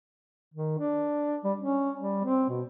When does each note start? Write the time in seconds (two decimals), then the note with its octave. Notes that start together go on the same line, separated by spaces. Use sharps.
0.54 D#3
0.79 D4
1.44 G3
1.58 C#4
2.00 G3
2.24 C4
2.50 B2